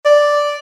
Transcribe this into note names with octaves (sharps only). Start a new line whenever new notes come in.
D5